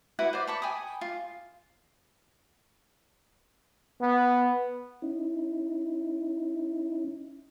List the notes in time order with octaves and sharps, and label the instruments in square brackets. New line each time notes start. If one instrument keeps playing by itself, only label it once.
[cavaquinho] E4 F#4 B4 F#5
C5 D5
A5 B5 C#6
G5 G#5 B5 D#6
F4
[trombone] B3
[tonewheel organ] C#4 D#4 E4